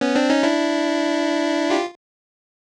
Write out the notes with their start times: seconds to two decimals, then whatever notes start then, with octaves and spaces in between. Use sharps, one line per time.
0.01 B3 C#4
0.15 C4 D4
0.30 C#4 D#4
0.43 D4 E4
1.70 F4 G4